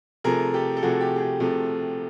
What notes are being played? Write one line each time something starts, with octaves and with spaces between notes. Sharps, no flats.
C3 F3 A3 G#4 A#4
G4 A4
A4
C3 F3 A3 F#4 G#4
G4
G#4
G4
C3 F3 A3